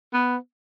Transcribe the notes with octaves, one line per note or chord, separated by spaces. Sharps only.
B3